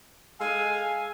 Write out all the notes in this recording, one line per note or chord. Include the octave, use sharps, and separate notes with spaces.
G#3 A4 F5 G#5